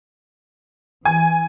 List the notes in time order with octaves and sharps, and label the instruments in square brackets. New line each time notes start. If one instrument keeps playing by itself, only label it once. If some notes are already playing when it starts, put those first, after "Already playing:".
[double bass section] E3 [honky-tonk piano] G#5